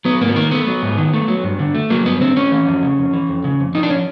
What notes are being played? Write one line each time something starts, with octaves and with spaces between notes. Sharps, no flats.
F#3 B3
G#2 A#3
B3
D#3 A#3
A3 B3
F#3
G#2
D#3
A3
F#3
G2
D3
A3
F#3 A#3
G2 B3
D3 C4
A3 C#4
E3
F2
C#3
F2
E3
F2
C#3
F2
F3 D#4
D4
C#4